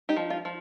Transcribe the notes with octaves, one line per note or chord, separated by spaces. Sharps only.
D#4 G4
F3
F4
F3